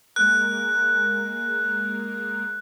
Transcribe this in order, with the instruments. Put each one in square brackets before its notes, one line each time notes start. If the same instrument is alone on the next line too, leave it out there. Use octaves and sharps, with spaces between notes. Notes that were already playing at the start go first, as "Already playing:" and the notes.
[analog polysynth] G#3 A#3 A#4 [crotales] F#6